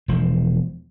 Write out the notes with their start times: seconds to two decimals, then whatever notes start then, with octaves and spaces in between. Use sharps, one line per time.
0.08 E1 F3